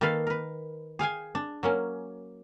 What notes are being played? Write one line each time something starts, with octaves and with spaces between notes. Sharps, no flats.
D#3 A#3 A4 B4 F5
A#4 B4
G#4 F5 G5 G#5
D4
F#3 A#3 C#4